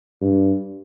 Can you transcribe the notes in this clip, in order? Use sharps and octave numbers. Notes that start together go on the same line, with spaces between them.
G2